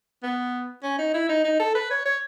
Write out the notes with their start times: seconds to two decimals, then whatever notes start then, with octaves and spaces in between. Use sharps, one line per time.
0.23 B3
0.83 C#4
0.99 D#4
1.14 E4
1.29 D#4
1.44 D#4
1.60 A4
1.75 B4
1.91 C#5
2.06 C#5